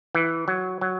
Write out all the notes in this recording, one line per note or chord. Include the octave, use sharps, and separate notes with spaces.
E3
F#3
F#3